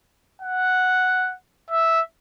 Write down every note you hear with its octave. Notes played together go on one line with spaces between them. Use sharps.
F#5
E5